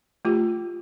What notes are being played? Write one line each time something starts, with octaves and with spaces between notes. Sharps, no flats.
A3 F4 G4